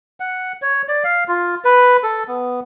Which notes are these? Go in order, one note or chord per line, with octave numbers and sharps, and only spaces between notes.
F#5
C#5
D5
F5
F4
B4
A4
B3